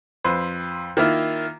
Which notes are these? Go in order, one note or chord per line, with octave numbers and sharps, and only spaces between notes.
F2 B4 C5
D#3 A#3 E4 F4